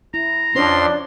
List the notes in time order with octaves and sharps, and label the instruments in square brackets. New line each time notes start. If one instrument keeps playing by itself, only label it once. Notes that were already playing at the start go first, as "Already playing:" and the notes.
[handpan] E4 [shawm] A#5
[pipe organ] F2 C6 [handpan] C#4 C5 C#5 [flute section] D4